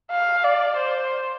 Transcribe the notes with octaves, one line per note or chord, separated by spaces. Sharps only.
F5
D5
C5